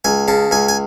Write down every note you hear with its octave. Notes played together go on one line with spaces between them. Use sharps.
C#2 G#5
C#3 A5
C#2 G#5
G#5